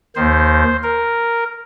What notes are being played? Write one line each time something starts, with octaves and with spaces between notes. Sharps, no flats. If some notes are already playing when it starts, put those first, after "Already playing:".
D#2 D#3 C5
A#4